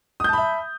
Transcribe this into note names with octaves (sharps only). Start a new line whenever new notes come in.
E5 A5 B5 D#6 G6